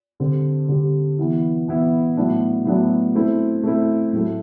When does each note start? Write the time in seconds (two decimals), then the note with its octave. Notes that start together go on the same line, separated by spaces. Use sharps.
0.20 D3 G3 C4
0.68 D3 G3 C4
1.18 E3 B3 E4
1.68 E3 B3 E4
2.17 A2 F#3 B3 D4
2.65 A2 F#3 B3 D4
3.15 A3 C4 E4
3.63 A3 C4 E4
4.13 A2 F#3 A3